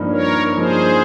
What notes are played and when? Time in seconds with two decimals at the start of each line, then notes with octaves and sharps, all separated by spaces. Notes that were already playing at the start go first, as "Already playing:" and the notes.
Already playing: G2 F3 A#3 D#4
0.11 A#4 C#5
0.57 G2 F3 A#3 D#4 G#4 C5